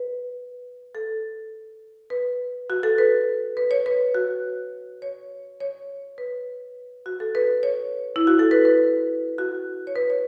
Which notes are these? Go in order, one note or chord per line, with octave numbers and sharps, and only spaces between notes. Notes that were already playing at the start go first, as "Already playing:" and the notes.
Already playing: B4
A4
B4
F#4
A4
B4
B4
C#5
B4
F#4
C#5
C#5
B4
F#4
A4
B4
C#5
E4
F#4
A4
B4
B4
F#4
C#5
B4
C#5